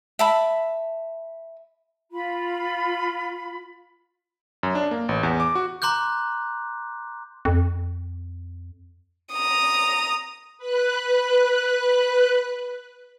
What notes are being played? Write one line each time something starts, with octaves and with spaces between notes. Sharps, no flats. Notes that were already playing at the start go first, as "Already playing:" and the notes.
E5 A5 B5
F4 B5
F#2
D4
A#3
A1
E2
D6
F#4
A#5 C6 D6 F#6 G6
F2
A#5 D#6
B4 F#6